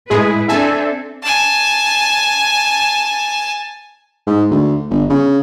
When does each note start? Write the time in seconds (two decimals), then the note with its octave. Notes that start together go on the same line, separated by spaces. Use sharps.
0.10 A2 G#3 E4 G#4 B4
0.48 C4 D4 A4 E5 G#5 A5
1.23 G#5 A5
4.27 G#2
4.51 D2
4.90 G1
5.10 C#3